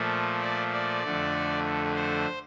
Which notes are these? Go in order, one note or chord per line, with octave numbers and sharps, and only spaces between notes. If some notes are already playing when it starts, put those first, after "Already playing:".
Already playing: A#2 F3 A3
D5
D5
F2 D3 A3
C5